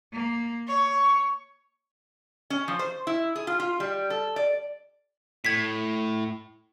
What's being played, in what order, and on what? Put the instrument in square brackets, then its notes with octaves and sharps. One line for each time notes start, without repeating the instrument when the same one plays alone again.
[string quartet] A#3
[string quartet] C#5 [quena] C#6
[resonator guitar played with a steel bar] C#4
F3
C5
E4
G#4
F4
F4
G3
A4
D5
[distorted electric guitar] A2 [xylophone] G#6 B6